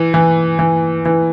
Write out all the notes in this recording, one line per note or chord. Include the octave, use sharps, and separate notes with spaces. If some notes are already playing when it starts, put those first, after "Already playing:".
Already playing: E3
E3
E3
E3